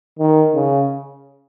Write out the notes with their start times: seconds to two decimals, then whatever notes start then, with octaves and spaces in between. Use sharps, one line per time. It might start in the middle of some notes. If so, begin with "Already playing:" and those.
0.19 D#3
0.55 C#3